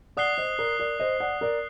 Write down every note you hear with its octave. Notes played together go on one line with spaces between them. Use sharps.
D5 F#5 D#6 F#6 C7 G7
C5 D#5
A#4 D5
A#4 D5
C5 D#5
D5 F#5
A#4 D5